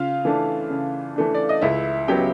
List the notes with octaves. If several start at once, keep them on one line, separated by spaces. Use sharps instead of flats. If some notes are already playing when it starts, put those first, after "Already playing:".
Already playing: C#3 F4 F5
E3 A3 D4
C#3
E3 A3 D4
D5
D#5
C#2 E4 E5
C#3 F#3 B3 G4 G5